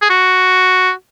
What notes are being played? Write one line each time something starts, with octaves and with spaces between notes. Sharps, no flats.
G#4
F#4